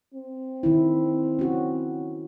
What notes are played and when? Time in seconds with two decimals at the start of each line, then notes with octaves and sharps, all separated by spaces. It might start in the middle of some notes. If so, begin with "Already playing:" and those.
0.14 C4
0.63 D#3 E4
1.39 C#4 F#4